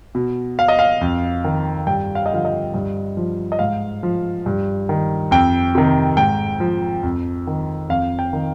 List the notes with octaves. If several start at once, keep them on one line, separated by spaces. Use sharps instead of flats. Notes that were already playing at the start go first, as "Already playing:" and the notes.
B2
F5
D#5
F5
F2
D#3
G2 G5
F5
D#5
D3 F3 F5
D#5
G2
F3
D#5
G#2 F5
F3
G2
D#3
F2 G5
C3 D#3
G#2 G5
F3
F2
D#3
F2 F5
G5
D#3